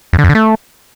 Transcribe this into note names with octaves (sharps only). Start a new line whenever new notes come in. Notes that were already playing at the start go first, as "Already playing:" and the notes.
F2
D3
F2
D3
A3